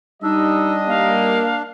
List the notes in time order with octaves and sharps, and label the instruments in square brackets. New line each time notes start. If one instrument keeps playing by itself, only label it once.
[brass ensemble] G3 D#5 [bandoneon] D4 [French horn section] D#4 [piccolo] E6
[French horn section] A#3 [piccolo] F5